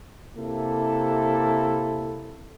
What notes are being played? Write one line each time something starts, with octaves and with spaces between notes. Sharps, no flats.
C3 A#3 E4 A4